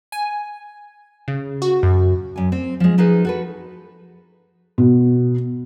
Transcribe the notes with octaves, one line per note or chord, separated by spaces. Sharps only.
G#5
C#3
F#4
F#2
F#2 G#5
C4
F3 G#3
F3 D#4 G#4 B4
F#4 A4 B4
B2